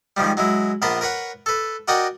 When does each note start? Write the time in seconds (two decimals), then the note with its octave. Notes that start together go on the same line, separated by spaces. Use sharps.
0.17 G#2 D#3 F3 G3
0.37 F#3 G#3 E4
0.82 A#1 B3 A#4 B4 A5 C6
1.01 A#4 B4 C#5 F#5
1.46 A4 B4
1.88 F#4 A#4 D5 D#5 F#5 G5